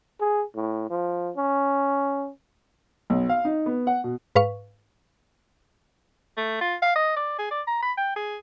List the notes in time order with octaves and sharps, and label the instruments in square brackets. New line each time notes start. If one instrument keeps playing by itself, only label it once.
[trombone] G#4
A2
F3
C#4
[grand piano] B1
F5
D#4
B3
F#5
B2
[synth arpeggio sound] G#2 B4 F5 C#6
[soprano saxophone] A3
F4
F5
D#5
D5
G#4
D5
A#5
B5
G5
G#4